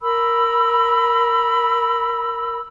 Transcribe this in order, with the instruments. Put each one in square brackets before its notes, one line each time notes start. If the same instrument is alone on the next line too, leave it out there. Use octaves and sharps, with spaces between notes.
[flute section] A#4 B5 E6